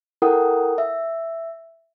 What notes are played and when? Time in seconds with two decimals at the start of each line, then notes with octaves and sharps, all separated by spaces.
0.22 E4 A4 A#4 F#5 G5 D#6
0.78 E5